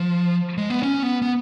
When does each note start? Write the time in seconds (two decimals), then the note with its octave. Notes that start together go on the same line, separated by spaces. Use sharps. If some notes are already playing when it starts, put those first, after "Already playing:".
Already playing: F3
0.58 G#3
0.70 B3
0.83 C#4
1.03 B3
1.22 B3